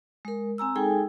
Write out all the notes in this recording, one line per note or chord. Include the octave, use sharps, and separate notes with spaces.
G#3 A#4
C4 G#5 A#5 E6
G#3 D#4 G#4 A4 G5 G#5